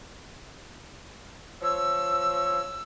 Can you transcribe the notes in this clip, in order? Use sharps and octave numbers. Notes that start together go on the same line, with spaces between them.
F3 C#5 E6